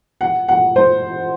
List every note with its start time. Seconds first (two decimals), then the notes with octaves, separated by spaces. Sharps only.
0.21 F#5
0.48 F#5
0.76 C5